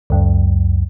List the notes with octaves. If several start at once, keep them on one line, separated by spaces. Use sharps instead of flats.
C#2 F#2